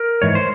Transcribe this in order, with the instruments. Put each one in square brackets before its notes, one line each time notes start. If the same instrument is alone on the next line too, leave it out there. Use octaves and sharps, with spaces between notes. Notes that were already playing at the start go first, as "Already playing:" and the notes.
Already playing: [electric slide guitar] A#4
G#2 E3 C#5
C5